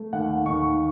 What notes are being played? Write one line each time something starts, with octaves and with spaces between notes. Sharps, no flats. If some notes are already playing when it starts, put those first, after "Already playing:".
Already playing: A3
D#2 F#5
D#2 C#6